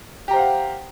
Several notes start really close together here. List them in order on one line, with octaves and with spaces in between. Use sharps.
G4 A#5 C5 F5 F#5